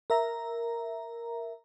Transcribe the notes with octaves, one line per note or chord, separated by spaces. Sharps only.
A#4 E5 A#5